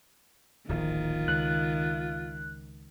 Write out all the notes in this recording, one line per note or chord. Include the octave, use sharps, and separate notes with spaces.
D1 A#1 D#3 F4
C#2 F#6